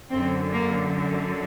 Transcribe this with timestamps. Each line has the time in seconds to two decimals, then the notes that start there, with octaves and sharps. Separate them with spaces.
0.11 F#2 D3 C4
0.53 A#3